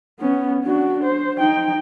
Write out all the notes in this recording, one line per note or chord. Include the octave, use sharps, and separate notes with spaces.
B3 C#4
D4 F#4
C5
D#4 G5